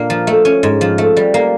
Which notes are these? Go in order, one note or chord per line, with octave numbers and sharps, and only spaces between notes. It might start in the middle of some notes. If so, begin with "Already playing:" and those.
Already playing: A#2 A#3 D4
F3
A3
C#4
G#2
F3
A3
G3
A#3